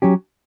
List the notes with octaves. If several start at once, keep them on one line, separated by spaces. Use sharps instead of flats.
F#3 C#4 G4